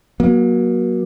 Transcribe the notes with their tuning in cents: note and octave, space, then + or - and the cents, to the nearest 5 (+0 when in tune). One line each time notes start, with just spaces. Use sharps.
F#3 +0 A#3 +35